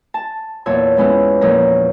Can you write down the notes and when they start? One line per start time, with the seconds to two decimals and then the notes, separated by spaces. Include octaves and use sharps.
0.14 A5
0.66 E2 A#2 C#5 A5 E6
0.97 E3 G#3 B3 C#4 E4
1.41 E2 A#2 F3 A#4 C#5 A#5